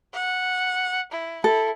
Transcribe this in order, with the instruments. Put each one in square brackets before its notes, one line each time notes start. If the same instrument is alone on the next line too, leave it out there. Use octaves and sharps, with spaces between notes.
[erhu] F#5
E4
[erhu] E4 [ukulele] A4